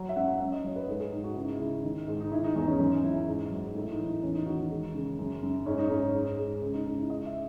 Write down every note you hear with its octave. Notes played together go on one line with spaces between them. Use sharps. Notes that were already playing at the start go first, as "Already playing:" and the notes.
Already playing: F#3
E5
F#2 F#5
F#5
F#2 E5
D#5
F#3 C#5
B4
G#2 A4
G#4
G#2 D#4
F#4
C#2 E4
D#4
E4
C#3
D#3
G#2
D#4
D#3 E4
D#4
E2 D#4
C#4
F#2 D#4
F#2 E4
G#2
F#3
A2 D#4
E4
D#4
E3
E2 C#4
D#4
D#3 F#4
D#4
G#3
C#3
F#2
F#2
G#2 C#4
D#4
G#2 C#4
G#2
G#3
C#2
D#4
C#2 D#4
E4
C#2 D#5
E5